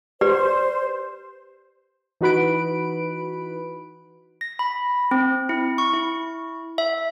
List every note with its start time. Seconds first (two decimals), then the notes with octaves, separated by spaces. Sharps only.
0.21 G4 B4 C5 D5
2.21 E3 D#4 F#4 B4 B5 D7
4.41 A#6
4.59 B5
5.11 C4
5.49 E4
5.78 C#6
5.93 E4
6.78 E5